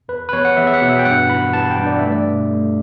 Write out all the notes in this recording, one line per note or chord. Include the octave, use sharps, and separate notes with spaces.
E2 B4
B4
E2 C#5
F#5
E2 E5
E5
F#5
B2
E5
G5
G2 F#5
E3 B5
E3 A5
G5
G2
D5
A3 E5
D5
B2
A3